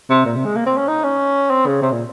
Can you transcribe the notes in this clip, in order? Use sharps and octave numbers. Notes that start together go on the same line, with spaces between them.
C3
A#2
C3
G#3
A#3
C4
C#4
D#4
C#4
C4
C#3
C3
A#2